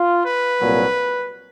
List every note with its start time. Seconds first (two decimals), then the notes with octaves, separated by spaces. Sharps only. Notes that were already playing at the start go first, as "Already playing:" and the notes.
Already playing: F4
0.23 B4
0.60 C2 A#2 F#3